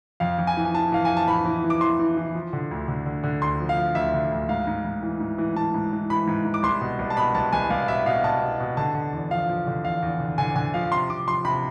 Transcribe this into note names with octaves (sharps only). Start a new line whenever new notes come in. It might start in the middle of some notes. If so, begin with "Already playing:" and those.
F2 F5
F2
G#5
E3
G#5
E3 A5
E3 F5
F2 G#5
A5
E3 B5
E3
E3
D6
E3 C6
E3
E3
F3
D3
D2
D3
D3
D3
D2 C6
F3
F5
F3
D2 E5
D3
D2
G#2 F5
G#2
G#2
E3
G#2
E3
E3 A5
G#2
E3
E3 B5
G#2
G#2
D6
C2 C6
B2
C2
A5
B2 B5
C2 A5
C2 G#5
C2 F5
B2 E5
B2 F5
B2 A5
B2
B2
D3 A5
D3
E2
F3 F5
F3
D3
E2 F5
E2
D3
D3 G#5
D3 G#5
F3 F5
C3 C6
C3 D6
F3 C6
C3 B5